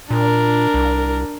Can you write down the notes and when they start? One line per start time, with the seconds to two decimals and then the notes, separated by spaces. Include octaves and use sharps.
0.11 A#2 D4 A#4
0.74 C2